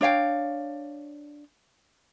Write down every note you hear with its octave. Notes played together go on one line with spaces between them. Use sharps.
D4 C#5 F5 G5